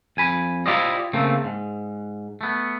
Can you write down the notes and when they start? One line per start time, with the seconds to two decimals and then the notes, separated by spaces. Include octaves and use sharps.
0.17 F2 G#5 B5
0.66 E4 F4 G4 C5 D5 D#5
1.13 C#3 A3 A#3 C4
1.44 G#2
2.41 A3 B3